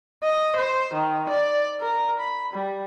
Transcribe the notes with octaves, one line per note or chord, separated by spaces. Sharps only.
D#5
C5
D#3
D5
A#4
B5
G3